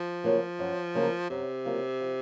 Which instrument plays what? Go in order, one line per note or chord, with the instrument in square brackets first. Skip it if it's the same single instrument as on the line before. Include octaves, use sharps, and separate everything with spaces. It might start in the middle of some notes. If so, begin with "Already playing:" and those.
Already playing: [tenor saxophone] F3
[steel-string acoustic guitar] C#3 F#3 A#3 F4
F#2
C#3 F#3 A#3 F4
[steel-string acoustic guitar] F#2 [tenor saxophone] C3
[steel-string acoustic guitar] C#3 F#3 A#3 F4
F3